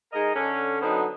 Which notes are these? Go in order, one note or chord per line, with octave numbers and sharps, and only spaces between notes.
G#3 D#4 A#4 D#5
D3 C#4
D3 F#3 B3 C4 D#4